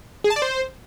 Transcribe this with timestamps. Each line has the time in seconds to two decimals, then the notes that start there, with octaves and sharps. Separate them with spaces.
0.24 G#4
0.30 A5
0.36 D5
0.42 C5